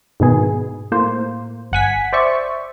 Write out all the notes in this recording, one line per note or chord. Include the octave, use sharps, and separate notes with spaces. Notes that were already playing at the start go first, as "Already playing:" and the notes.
G#2 B2 D#3 B3 G#4
A2 A#3 C5
G1 F#5 G#5 B6
C5 D5 E5 C#6